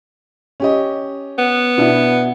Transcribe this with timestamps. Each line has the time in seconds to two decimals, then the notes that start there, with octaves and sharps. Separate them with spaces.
0.60 C#4 G4 D#5
1.39 B3
1.78 B2 D4 E4